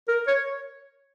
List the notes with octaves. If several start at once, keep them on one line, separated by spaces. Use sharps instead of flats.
A#4
C#5